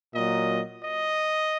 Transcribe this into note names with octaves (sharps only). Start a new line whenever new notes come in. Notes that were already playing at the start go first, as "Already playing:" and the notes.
A#2 F#3 D#5
D#5